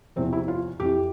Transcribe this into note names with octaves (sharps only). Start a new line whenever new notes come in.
E2 C3 F3 C4
E4
F4
F2 E3 G4